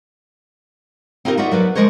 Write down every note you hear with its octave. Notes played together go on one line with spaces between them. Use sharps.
C4 D#4 F4 G4 G#4 A#4
D#4 F4 F#4 D5 E5
F#3 A#4 B4 D5
F3 F#3 G#3 A#4 C5 C#5